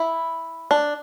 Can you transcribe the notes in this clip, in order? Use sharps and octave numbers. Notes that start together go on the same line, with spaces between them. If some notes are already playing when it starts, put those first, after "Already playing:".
Already playing: E4
D4